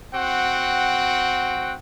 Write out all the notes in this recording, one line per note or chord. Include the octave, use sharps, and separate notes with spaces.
C4 F#4 F#5 G5